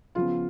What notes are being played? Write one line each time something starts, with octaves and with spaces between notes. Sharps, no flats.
C#3 F3 B3 F4